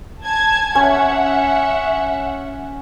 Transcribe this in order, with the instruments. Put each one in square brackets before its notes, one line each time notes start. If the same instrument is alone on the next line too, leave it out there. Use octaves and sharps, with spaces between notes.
[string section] G#5 A5 G#6
[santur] C#4 [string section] E5 F#5